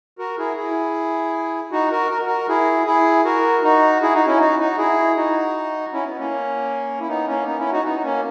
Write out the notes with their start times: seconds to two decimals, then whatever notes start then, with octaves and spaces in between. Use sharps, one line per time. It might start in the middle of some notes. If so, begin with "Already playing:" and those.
0.18 F#4 A#4
0.38 E4 G#4
0.57 E4 G#4
1.71 D#4 F#4
1.91 F#4 A#4
2.10 A#4
2.26 F#4 A#4
2.48 E4 G#4
2.87 E4 G#4
3.25 F#4 A#4
3.63 D#4 F#4
4.02 E4 G#4
4.14 D#4 F#4
4.27 C#4 E4
4.39 D#4 F#4
4.59 D#4 F#4
4.78 E4 G#4
5.17 D#4 F#4
5.93 C#4 E4
6.06 B3
6.19 A#3 C#4
7.00 E4
7.08 B3 D#4
7.27 A#3 C#4
7.46 B3 D#4
7.59 C#4 E4
7.72 D#4 F#4
7.85 B3 D#4
8.03 A#3 C#4